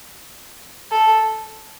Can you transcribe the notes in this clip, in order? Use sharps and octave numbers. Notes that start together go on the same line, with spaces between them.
A4